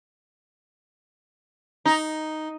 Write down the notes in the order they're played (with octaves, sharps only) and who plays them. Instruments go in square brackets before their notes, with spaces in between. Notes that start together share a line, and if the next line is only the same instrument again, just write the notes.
[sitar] D#4